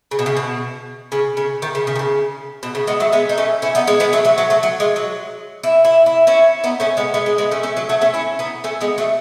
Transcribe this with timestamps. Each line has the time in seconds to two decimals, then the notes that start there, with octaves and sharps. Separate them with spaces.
0.11 C#3
0.19 B2
0.26 C#3
0.37 B2
1.12 C#3
1.37 C#3
1.62 D#3
1.75 C#3
1.87 C#3
1.96 D#3
1.99 C#3
2.63 B2
2.75 C#3
2.87 G#3 B3
3.00 F#3 A3
3.13 G#3 B3
3.29 D#4
3.38 A3 C#4
3.62 C#4 E4
3.75 B3 D#4
3.87 G#3 B3
4.00 G#3 B3
4.13 F#3 A3
4.25 F#3 A3
4.38 F#3 A3
4.50 F#3 A3
4.63 F#3
4.80 G#3
4.96 F#3
5.63 E4
5.85 E4
6.06 E4
6.27 C#4 E4
6.64 B3 D#4
6.80 A3 C#4
6.97 G#3 B3
7.14 G#3 B3
7.26 G#3
7.38 G#3 B3
7.51 A3 C#4
7.63 A3 C#4
7.77 F#3
7.89 F#3 A3
8.01 A3 C#4
8.14 C#4 E4
8.39 B3 D#4
8.64 A3 C#4
8.81 G#3 B3
8.98 F#3 A3